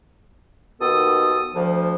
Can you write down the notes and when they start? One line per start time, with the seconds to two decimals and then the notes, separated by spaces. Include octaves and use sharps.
0.80 D#2 B2 D#3 B3 A4 D#6
1.55 D2 F3